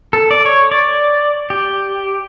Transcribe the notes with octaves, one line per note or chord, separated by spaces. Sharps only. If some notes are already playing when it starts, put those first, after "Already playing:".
A4
D5
C#5
D5
G4